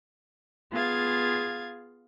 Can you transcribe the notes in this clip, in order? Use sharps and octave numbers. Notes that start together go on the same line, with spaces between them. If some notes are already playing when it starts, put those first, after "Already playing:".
B3 F4 G#4 F5 G#6 A6